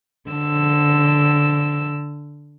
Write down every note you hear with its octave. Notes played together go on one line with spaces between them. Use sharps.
D3 E6